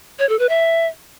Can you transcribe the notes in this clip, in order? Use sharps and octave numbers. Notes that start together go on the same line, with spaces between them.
C#5
A4
B4
E5